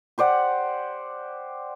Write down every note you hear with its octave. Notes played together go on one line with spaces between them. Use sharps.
G4 C5 D5 F#5